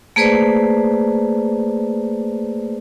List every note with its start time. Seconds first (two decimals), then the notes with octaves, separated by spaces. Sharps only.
0.16 A3 A#3 G#4 B4 C5 D5